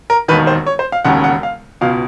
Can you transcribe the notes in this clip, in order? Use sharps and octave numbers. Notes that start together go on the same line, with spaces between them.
A#4
E1 D#2 D#3 B4
C5
C#5
C5
F5
E1 D#2 C#3 F#5
F#5
F5
C#2 B2 F5